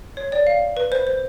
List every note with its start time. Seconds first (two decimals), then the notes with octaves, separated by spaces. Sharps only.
0.17 C#5
0.32 D5
0.47 F5
0.77 B4
0.92 C5
1.07 C5